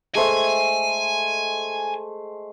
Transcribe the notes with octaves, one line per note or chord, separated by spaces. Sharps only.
G#3 A3 C5 G#5